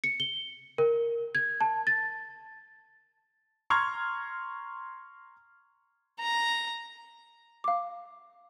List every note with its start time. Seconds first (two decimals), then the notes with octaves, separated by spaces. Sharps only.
0.04 C#7
0.20 G7
0.78 A#4
1.35 G#6
1.61 A5
1.87 A6
3.70 A#5 C6 C#6 F6 G#6
6.19 A#5
7.64 F5 D6